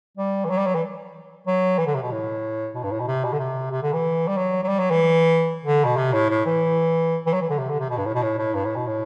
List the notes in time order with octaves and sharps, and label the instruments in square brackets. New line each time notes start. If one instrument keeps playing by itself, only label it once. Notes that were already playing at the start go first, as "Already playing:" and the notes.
[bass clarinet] G3
E3
F#3
G3
F#3
E3
F#3
E3
D3
C3
B2
A2
B2
G2
A2
B2
C3
B2
D3
C3
C3
D3
E3
G3
F#3
F#3
G3
F#3
E3
D3
B2
C3
A2
A2
E3
E3
F#3
E3
D3
C3
D3
C3
B2
G2
A2
B2
A2
A2
G2
A2
B2
A2